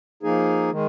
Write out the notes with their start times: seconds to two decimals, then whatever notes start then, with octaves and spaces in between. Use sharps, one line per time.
0.23 F3 A#3 D#4 G#4
0.71 D#3 G#3